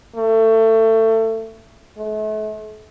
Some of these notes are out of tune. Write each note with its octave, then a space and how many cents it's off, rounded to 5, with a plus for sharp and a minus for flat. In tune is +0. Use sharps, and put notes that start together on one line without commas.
A3 +25
A3 -40